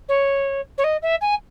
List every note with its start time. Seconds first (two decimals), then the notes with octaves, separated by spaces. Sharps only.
0.08 C#5
0.78 C#5
0.84 D#5
1.02 E5
1.21 G#5